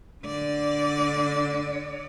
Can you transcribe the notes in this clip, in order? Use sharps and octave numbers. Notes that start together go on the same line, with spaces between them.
D3 D5